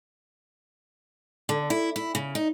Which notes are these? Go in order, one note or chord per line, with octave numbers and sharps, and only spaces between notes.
D3
E4
E4
C#3
D#4